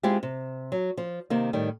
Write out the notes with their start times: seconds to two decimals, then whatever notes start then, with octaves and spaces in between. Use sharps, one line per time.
0.03 G#3 C4 E4 F4 G4
0.23 C3
0.72 F#3
0.97 F3
1.30 C3 D#3 A#3
1.53 A2 D#3 G3